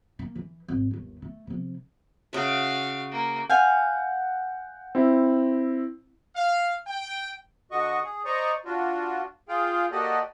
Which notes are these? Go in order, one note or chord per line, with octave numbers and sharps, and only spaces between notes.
A#3
E3
G#1
G1 D#2
A3
C3 F3
C#3 F#4 E5 F5
A#3
F5 F#5 G#5 G6
C4 E4
F5
G5
D3 F#4 D#5 C#6
G#4
C5 D5 D#5 A#5 C#6
D4 F4 F#4
F4 G#4 F5 G5
A#3 F#4 G4 A4 D5 D#5